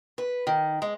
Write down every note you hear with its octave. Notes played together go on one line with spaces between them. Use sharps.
B4
D#3
G#3